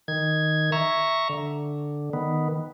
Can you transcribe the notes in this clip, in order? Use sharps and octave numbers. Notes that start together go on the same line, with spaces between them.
D#3 G#6
E5 A#5 C#6
D3
D#3 B3